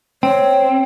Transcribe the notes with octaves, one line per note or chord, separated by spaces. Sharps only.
C4 C#5 G5